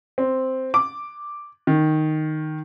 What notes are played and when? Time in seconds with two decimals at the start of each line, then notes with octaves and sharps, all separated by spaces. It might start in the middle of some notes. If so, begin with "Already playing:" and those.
0.18 C4
0.74 D6
1.67 D#3